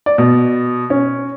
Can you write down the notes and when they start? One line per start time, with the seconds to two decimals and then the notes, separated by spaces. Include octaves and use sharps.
0.06 D5
0.18 B2
0.90 C#4